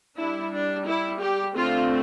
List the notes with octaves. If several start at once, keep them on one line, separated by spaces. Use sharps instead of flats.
G3 D4 E4
D4
E4
G4
D3 A3 C4 F4